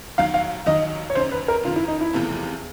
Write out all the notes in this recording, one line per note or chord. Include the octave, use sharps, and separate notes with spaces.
D#2 D#3 F#3 F5
F5
D#2 D#3 F#3 D#5
C#5
F#1 F#2 D#3 C5
B4
A#4
F#1 F#2 D#3 F4
E4
D#4
E4
F#1 E2 C3 F3 A3